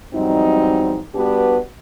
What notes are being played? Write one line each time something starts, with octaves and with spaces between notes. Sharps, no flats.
E2 G#2 F#3 G3 C4 D#4
G3 B3 D4 F#4 G4 B4